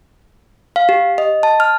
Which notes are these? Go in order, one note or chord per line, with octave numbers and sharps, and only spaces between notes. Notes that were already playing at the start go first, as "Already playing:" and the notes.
F5
G4
D#5
A5
F6